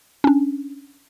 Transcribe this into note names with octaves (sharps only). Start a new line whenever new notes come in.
C#4 D4